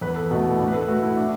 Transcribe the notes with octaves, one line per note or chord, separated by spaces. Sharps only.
E2 B4
A4
B2 A3 F#4
E4
A2 D4
B4
A4
A3 F#4
E4
D4